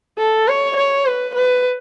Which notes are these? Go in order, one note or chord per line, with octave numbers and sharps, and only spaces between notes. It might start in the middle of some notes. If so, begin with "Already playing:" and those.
A4
C#5
C#5
B4
B4